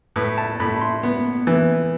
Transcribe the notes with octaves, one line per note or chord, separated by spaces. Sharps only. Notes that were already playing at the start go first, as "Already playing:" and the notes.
A2 B4
A5
A2 B5
C6
B3
E3